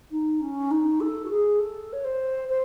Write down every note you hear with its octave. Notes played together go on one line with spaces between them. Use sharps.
D#4
C#4
D#4
A4
F#4
G#4
A4
C#5
C5
C5